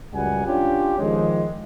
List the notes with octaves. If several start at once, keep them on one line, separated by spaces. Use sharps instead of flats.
C#2 F#2 G3 F#5 G#5
C#4 D4 F4 G4
D#3 F3 G#3